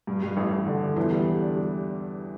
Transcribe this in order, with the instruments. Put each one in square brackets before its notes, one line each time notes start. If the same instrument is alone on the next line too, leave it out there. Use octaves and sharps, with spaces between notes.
[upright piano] G2
G2
A1
A1
D3
D3
[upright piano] E2 [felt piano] E3
[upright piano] G3
D3
D4
G3